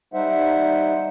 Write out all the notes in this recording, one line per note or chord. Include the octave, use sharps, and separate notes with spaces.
G3 D#4 C5 E5 F#5